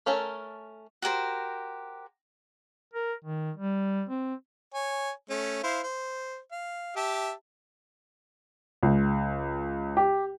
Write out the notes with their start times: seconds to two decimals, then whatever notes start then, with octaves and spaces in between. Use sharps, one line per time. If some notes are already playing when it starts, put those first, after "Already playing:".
0.06 A3 C#4 A4 A#4 C#5
1.02 F#4 G4 A#4 C5
2.93 A#4
3.24 D#3
3.57 G3
4.09 C4
4.74 C#5 G#5
5.30 A3 C#4
5.63 E4 C5 F5
5.83 C5
6.52 F5
6.96 G4 E5 A5
8.83 C#2
9.97 G4